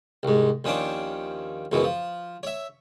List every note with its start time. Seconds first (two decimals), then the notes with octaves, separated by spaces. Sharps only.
0.23 C2 G#2
0.64 D#2 F3 C#4 D4 C5 D6
1.72 C#2 F#2 B2 E3
1.84 F3
2.43 C#5 E5